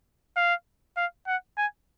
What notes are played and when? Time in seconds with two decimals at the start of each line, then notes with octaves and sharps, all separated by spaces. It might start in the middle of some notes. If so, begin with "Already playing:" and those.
0.36 F5
0.97 F5
1.27 F#5
1.58 G#5